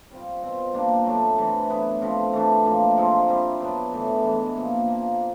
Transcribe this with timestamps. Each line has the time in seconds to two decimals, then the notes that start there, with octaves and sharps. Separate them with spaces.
0.11 G3 C4 F4
0.42 B2 G3 C4 F4
0.74 A#2 G3 A#3 D4
1.06 F#3 A3 D4
1.38 C3 E3 A3
1.70 F#3 B3 E4
2.02 C3 F3 A3 C4
2.33 E3 A3 D4
2.65 A2 F3 A#3
2.97 C3 F3 G#3 C4
3.28 G3 C4 E4
3.60 F#3 B3 D4
3.92 A2 E3 A3
4.25 E3 G#3 B3
4.56 A#2 F3 A#3
4.88 C3 F3 A#3